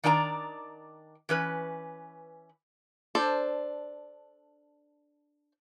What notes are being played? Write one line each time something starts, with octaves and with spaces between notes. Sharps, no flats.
D#3 D4 D5 G#5 A#5
E3 C#4 B4
D4 A4 C5